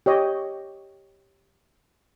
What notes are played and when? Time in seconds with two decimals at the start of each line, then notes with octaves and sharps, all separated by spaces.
0.06 G4 C#5 D#5